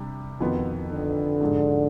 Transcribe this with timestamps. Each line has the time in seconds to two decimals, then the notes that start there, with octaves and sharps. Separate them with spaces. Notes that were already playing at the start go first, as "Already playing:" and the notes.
Already playing: C3 G3 D4 G4
0.41 F2 B2 D#3 B3 F4 B4
0.90 D3
1.41 G#2 F3 G#3 D4